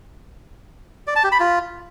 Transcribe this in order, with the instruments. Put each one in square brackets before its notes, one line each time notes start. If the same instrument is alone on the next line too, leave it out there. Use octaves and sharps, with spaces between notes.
[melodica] D5
A5
G4
B5
F4